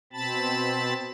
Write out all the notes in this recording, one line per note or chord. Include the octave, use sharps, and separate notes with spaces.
B2 C4 A5 B5 A6